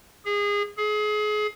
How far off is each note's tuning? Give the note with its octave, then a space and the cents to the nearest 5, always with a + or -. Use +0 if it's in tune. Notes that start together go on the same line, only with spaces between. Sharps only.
G#4 -25
G#4 +30